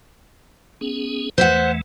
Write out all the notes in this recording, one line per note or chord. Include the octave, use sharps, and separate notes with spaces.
B3 C#4 G#4
E2 E3 A3 C5 E5 F#5